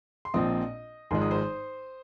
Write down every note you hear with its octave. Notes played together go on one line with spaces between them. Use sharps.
C6
A#1 A#2 F3 C4 D#5 D#6
G#1 G#2 F3 G#3 C6
D#6
C5 C6